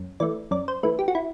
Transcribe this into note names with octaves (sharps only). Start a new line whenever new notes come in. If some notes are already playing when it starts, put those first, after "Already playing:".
Already playing: F#2
E3 A3 D5
F#2 D5
C5
E3 A3 B4
G4
F#4
E4